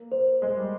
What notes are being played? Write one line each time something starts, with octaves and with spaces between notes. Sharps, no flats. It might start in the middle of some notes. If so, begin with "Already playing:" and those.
Already playing: A#3
C5
G#3 D#5
G3